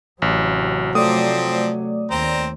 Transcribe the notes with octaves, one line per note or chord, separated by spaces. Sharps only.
A1 C3 F#3
F3 A3 C4 D5 D#6
D#2 C4 C5 A#5